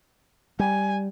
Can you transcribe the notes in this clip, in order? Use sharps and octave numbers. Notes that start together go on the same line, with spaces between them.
G3 G#5